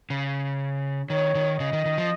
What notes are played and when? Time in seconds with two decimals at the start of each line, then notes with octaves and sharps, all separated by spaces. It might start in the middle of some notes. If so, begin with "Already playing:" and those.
0.10 C#3
1.10 D#3 C#5
1.35 D#3
1.60 C#3 D#5
1.73 D#3
1.85 D#3
1.98 F3